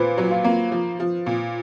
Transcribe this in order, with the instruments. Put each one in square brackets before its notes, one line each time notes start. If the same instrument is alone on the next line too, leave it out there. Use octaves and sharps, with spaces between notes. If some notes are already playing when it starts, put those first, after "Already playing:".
Already playing: [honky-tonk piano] A#2 [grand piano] B4 C5
[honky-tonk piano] F#3
[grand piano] F4
[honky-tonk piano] A#3
F3
F3
A#2